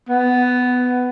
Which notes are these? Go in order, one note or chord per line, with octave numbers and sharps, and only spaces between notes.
B3